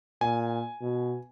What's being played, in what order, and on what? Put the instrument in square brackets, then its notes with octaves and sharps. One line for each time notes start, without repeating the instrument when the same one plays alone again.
[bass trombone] A#2 [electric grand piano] G#5
[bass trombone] B2